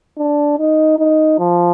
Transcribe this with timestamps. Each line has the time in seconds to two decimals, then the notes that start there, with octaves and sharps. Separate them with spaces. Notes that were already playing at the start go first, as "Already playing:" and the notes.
0.18 D4
0.58 D#4
0.99 D#4
1.39 F3